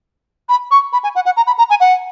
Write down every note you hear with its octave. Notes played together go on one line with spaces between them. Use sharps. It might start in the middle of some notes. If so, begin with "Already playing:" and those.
B5
C#6
B5
G#5
F#5
F#5
A#5
B5
A#5
G#5
F#5